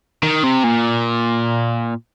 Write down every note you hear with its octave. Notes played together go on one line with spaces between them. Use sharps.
D#3
C3
A#2